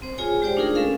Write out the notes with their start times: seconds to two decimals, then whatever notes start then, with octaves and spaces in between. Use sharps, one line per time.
0.02 C4 C5
0.18 F4 G#4 C#5 G#5
0.42 G#3 G4 C5 D5 G5
0.56 A3 D4 D#4 F4 G#4 A#4
0.75 G#3 C#4 A4 A#4 F5